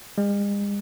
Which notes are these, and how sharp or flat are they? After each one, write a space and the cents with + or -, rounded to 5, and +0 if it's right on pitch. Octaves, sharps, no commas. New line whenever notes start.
G#3 -45